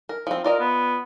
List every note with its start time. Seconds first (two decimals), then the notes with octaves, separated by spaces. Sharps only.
0.09 A#4
0.27 F3 C4
0.44 F4 A#4 D5 D#5
0.60 B3